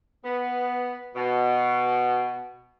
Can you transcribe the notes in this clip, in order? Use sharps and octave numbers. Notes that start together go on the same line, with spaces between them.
B3
B2